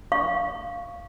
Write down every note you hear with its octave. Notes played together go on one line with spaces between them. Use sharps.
F5 C#6